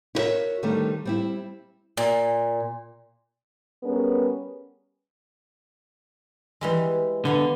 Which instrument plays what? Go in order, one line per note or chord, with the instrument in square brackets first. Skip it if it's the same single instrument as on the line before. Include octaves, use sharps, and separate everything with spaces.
[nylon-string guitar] E4 F#4 A#4 B4 C#5 E5
D3 D#3 G3 A3 C4
G3 C4 E4
[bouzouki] A#2
[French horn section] G3 B3 C#4 G#4 A#4 B4
[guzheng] E3 G3 G#3
[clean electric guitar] D3 [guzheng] B3 F5 G#5